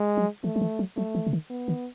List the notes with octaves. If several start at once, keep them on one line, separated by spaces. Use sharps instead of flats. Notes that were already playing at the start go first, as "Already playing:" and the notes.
Already playing: G#3
F#3
E3 A3
F#3
E3
F#3
F#3 A3
E3
C#3
D#3
B3
D#3